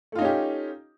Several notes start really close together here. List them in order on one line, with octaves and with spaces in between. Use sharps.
A3 F4 D#4 C#4 G4